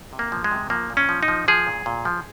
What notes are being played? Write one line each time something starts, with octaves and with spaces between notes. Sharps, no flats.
C3
A#3
F3
G#3
C3
F3 A#3
A#2
C#4
F3
D#4
F3
F3 G#4
A#2
A#2
F3